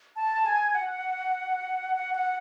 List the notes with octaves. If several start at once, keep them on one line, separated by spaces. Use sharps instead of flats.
A5
G#5
F#5
F#5
F#5